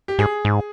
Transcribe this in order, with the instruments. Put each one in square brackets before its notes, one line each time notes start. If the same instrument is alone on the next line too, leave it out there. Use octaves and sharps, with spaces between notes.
[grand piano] G4
[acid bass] G#2 [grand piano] G#4
[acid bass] G#2